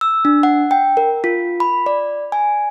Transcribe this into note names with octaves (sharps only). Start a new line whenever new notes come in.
E6
D4
F#5
G5
A#4
F4
B5
D5
G#5